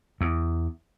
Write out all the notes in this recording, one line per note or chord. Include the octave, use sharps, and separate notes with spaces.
E2